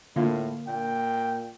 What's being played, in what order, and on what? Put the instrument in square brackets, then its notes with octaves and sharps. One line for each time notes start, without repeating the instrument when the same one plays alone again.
[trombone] A2 [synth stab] D3 A#3 [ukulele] F4
[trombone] A#2 [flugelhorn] G5